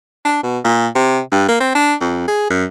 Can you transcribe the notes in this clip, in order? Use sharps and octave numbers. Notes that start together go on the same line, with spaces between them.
D4
B2
A#2
C3
G2
A#3
C4
D4
F2
G#4
F#2